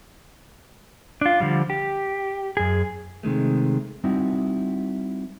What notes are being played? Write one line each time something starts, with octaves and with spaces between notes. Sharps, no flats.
D4 F4
D3 F3 G3
G4
F#2 G#4
C3 D#3 G#3 A3
G3 C4 D#4 E4 F#4